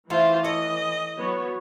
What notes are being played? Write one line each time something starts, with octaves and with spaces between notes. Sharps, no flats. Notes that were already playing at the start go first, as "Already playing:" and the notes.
E3 A3 F4 C5
A4 C#5 D#5
F#3 B3 C#5